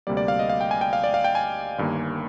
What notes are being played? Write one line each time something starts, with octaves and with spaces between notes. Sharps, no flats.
D2 C3 G3 A#3 D5
D5
F5
D#5
F5
G5
G#5
G5
F5
D5
F5
G5
G#5
G1 G2 D#3 A#3